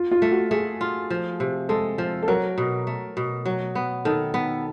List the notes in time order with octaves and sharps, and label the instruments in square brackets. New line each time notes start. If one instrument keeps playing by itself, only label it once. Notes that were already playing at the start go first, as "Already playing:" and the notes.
Already playing: [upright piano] F4
F4
[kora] A3
[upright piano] F#4
[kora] A3 [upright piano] G#4
[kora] F4
F3
C3
[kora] G#3 [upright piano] A4
[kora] F3
[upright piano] A4
[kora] F#3 [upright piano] A#4
[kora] B2
A3
B2
F#3
B3
[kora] D#3 [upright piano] A4
[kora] B3